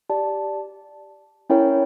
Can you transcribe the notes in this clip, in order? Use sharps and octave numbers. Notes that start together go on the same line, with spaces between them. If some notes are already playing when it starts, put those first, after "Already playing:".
G4 D5 A5
C#4 E4 A#4 C#5 G5